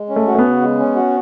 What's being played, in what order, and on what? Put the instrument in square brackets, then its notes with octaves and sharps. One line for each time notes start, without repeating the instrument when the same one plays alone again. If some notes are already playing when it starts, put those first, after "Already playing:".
Already playing: [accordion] G#3
C#4
[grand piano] A3
[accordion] F#4
[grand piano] A3
B3
[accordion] C#3
G#3
C#4
F#4